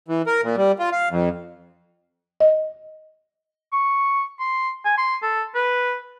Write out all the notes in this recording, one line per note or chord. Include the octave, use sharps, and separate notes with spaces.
E3
A#4
A#2
G3
F4
F5
F2
D#5
C#6
C6
G#5
C6
A4
B4